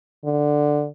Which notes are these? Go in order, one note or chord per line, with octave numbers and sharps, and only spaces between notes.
D3